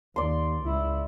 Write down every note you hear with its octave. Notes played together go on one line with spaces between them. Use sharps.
D#2 D5 C6
C#2 E4